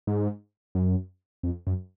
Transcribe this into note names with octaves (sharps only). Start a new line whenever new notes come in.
G#2
F#2
F2
F#2